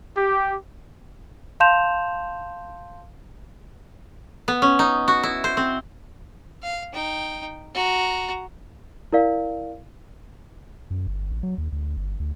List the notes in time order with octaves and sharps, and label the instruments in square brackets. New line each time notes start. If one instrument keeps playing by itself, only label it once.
[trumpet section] G4
[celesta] F5 A5 C6 G6 E7 F7
[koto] B3
C#4
D#4
F#4
E4
C5
C4
[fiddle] F5
D#4 G5
F#4 A#5
[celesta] E4 A#4 D5 F5
[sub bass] F#2
G1
A1
F#3
D#2
D2
G1
D2